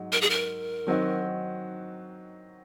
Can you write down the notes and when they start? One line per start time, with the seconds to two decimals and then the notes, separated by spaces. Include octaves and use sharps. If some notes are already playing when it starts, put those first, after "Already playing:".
Already playing: G#2 F#3 D#4
0.12 A#4
0.21 G#4
0.30 A#4
0.87 D#3 F#3 C4 D#4 F#4